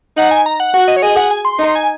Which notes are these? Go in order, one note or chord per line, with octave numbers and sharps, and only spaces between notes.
D#4 F#5
G#5
A#5
F#5
F#4 F#5
D#5
C#5
G#4 D#5
F#5
G#5
C6
D#4
G#5